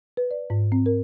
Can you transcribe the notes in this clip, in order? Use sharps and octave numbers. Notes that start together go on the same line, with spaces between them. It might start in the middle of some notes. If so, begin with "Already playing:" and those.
B4
D5
G#2
C4
A#4